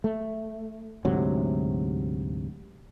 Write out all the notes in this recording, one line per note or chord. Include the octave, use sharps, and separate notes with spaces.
A3
D2 G#2 C3 F#3